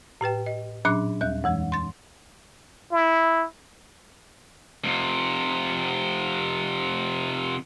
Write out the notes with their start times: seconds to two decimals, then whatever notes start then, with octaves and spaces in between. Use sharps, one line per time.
0.21 A2 G4 B4 G5
0.46 D#5
0.85 A#2 F#3 C#4 D4 D6 F#6
1.21 D#2 G3 F#6
1.44 F2 E3 G#3
1.72 C6 A6
2.92 E4
4.84 F2 C3